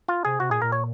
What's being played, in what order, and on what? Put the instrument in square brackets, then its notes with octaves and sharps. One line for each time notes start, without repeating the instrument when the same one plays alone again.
[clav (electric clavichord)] F4
[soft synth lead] C3 [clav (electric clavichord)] G#4
[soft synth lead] C3 [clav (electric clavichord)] F#4
[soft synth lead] A#2 [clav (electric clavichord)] G#4
[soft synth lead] A#2 [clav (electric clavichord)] A#4
[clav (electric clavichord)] C#5